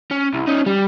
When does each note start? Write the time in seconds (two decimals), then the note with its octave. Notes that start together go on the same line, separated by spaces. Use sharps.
0.11 C#4
0.34 C2
0.48 C#4 D#4
0.66 G3